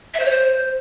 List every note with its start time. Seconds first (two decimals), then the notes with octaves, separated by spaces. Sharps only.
0.14 E5
0.20 C5
0.25 C#5
0.31 C5